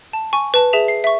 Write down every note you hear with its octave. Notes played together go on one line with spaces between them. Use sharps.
A5
G#5 C#6
B4 A5
G#4 E5 E7 F7
C7
E5 C#6